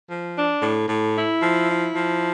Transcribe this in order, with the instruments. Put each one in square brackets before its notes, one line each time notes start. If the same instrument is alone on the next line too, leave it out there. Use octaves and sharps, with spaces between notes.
[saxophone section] F3
D4
A2
A2
E4
F3
E4
F3